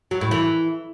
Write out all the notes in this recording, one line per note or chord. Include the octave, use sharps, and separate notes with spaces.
F#3
A2
E3